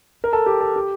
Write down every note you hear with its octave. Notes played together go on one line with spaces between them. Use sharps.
A#4
A4
G4
A4
G4